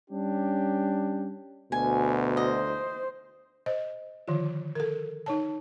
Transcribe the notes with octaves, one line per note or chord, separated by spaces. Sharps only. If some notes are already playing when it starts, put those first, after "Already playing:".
G3 C#4 D4 G4
D2 B2 G#5
C5 D#5
C5 D#5
D3 D#3 F3 F4
A4 A#4
D#4 C#5 A5